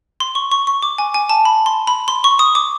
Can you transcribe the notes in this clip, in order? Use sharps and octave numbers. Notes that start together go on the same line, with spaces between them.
C6
C#6
C#6
C#6
D6
G#5
G#5
A5
B5
C6
B5
C6
C#6
D#6
D6